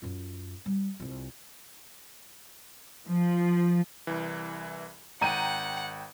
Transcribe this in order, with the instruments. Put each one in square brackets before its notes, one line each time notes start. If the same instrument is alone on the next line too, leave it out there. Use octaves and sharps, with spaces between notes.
[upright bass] F#2 F4
G3
C2 F4
[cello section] F3
[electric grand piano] C2 E3
[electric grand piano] G#1 G5 [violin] F#5 [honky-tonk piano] A#5 D#7